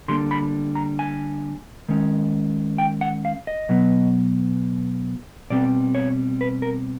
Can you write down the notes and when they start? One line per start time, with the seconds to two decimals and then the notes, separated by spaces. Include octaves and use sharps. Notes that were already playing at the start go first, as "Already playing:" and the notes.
0.08 D3 G3 A#3 C6
0.31 B5
0.75 A#5
0.99 G#5
1.89 D#3 G#3 C#4
2.78 G5
3.01 F#5
3.25 F5
3.47 D#5
3.69 B2 F#3 B3
5.50 B2 G3 C4 D5
5.95 C#5
6.41 B4
6.62 A#4